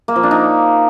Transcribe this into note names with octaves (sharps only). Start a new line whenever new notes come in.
A#3
F3
D4
D#4